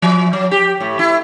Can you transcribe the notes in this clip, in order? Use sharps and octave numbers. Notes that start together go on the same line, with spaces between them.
F3
F#3
G4
A2
E4